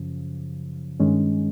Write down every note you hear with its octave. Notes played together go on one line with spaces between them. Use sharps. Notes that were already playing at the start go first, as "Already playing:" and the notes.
Already playing: F#2 C#3 F3
G2 D#3 G#3 C#4